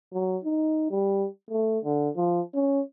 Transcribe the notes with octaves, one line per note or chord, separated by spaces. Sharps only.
F#3
D#4
G3
A3
D3
F3
C#4